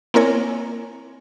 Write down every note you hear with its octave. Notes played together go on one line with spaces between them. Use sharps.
A#3 C4 E4 A#4 C#5 G#5